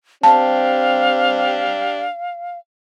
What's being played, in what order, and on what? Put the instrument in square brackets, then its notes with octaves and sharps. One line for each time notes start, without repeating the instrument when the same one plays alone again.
[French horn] C4 [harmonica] D4 G4 [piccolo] F5 [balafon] A5